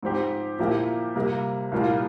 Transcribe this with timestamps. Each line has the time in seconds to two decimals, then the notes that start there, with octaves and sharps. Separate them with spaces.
0.03 G#2 F3 C4 G4
0.59 A#2 F3 A#3 E4 G4
1.15 C3 G3 A#3
1.72 C2 A#2 G3 A#3 F4